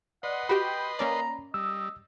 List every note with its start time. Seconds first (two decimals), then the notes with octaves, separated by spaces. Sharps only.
0.23 B4 D5 D#5 F#5 C6
0.49 F#4 G4 G5 B5
0.99 A#3 C#4 D5 A#5
1.54 G3 D#5 E6